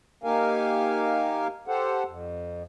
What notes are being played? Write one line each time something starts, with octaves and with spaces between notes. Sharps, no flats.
A#3 D#4 G4 A#4 F5 G#5
G4 A4 C5 F#5
F2